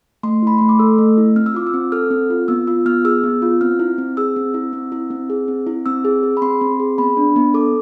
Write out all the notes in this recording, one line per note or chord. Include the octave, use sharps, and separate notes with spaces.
A3 C6
E4 B5
A3 C6
D6
A4 E6
A3
E4
C4 F6
E6
F4 D6
E6
C4
A4 F6
C4
F4
B3 E6
F4 E6
B3 F6
G#4 E6
B3
F4
C4 F6
E4
C4
G#4 E6
C4
E4
C4
E4
C4
G#4
C4
E4
C4 E6
G#4
G#4
B5
C4 C6
C4
G#4
B3 B5
D4
B3
A4 D6